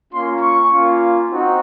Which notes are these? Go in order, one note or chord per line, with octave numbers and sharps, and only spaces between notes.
A#3 C#4 F4 C6
C#6
A#3 C#4 F4
C4 D#4 F#4